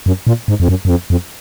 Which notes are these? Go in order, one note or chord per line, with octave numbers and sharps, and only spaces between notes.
F#2
A#2
G#2
F2
F#2
F#2
F2
F2